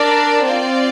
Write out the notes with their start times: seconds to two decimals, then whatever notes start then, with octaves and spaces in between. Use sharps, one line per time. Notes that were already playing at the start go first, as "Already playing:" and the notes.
Already playing: D4 A#4 D5
0.44 C4 F4 D5